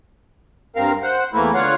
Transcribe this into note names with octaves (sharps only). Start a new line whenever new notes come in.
G2 C4 A#4 F5
C5 F#5
E2 E3 A3 A#3 E4
D3 F4 C#5 F5 F#5